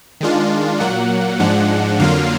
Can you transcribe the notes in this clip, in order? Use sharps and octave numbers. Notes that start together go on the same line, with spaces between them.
D#3 G#3 D4 F4
A#2 F#3 A#3 F#5
G#2 F3 G#3 D4 F#5
F2 D3 F#3 A#3 F4 F5